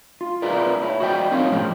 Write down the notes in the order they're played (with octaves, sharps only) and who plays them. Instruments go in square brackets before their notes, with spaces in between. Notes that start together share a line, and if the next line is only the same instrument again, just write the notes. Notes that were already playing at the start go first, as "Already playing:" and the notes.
[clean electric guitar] F4
E4 F4 G#4 A#4 B4 D5
E4 C#5
F#4 C5 D5 D#5 G5
C4 C#4 D#4 F4 A#4 C#5
B1 A2 F3 G#3 C4 G4